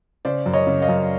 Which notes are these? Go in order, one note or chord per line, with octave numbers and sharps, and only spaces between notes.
C#3 C5 D5
F#2
C#5 D#5
C#3
D#5 F5
F#2